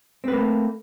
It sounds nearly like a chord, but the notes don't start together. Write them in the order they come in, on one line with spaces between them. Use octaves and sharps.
C4 B4 A#3 A3